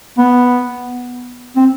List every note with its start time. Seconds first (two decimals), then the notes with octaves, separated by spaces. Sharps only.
0.18 B3
1.56 C4